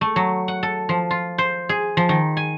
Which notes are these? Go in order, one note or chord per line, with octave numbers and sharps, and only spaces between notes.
A3
F#3
F#5
A4
F3
F4
C5
G#4
F3
D#3
G#5